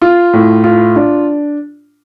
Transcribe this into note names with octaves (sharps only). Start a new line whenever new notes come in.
F4
A2
F4
D4